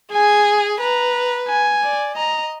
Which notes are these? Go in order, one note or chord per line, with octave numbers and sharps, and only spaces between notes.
G#4 G#5
B4 A#5
G#5
D5
D#5 A#5